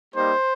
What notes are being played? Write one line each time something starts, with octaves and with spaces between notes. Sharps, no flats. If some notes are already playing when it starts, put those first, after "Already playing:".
G3 A#3 D#4 G4 C5